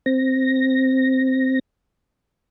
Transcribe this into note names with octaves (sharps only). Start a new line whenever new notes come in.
C4 A#6